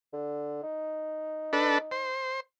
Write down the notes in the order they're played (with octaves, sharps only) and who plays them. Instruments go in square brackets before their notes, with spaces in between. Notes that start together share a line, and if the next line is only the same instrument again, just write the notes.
[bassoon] D3
D#4
[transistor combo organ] D4 A4 B4
C5